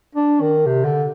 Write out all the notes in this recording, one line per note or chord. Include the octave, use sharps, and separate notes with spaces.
D4
D#3
C3
D3